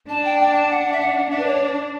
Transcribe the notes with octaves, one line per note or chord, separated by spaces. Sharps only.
D4 A5
G5
G5
A5
F#5
E5
F#5
D4 E5
B4
C#5